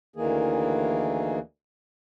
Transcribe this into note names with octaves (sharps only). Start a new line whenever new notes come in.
D2 D#3 E3 A#3 G#4